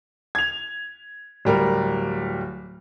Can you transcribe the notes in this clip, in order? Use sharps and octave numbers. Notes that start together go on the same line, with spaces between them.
G#6 F7
D1 G3 A#4